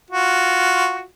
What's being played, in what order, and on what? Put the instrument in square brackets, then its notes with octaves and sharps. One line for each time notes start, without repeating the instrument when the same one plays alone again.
[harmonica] F4 F#4